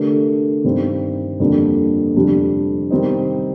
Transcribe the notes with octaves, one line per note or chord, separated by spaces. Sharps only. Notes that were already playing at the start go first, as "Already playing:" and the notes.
Already playing: D3 A3 D4 G4 A#4
G2 D#3 G3 C4
F2 D3 G3 A#3 D4
F2 D3 G3 D4 G4
D#3 G3 C4 D#4